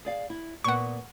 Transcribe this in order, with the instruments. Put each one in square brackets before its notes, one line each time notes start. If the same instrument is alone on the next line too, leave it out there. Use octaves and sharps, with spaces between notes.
[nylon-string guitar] G#4 D5 F5
E4
[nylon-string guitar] A#2 B3 [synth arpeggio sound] F#5 C#6